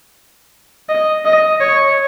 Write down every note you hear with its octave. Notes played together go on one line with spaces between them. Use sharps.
D#5
D#5
C#5